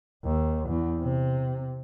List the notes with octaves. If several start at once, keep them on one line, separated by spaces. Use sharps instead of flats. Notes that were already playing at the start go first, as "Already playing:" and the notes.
D#2
E2
C3